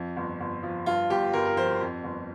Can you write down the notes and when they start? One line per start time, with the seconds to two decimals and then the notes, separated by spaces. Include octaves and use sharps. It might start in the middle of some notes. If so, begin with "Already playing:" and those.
Already playing: F2 F3
0.16 G1
0.40 G1
0.63 F3
0.86 G2 F4
1.10 G1 G4
1.33 G1 A#4
1.45 A#4
1.56 F3 C5
1.81 F2
2.04 G1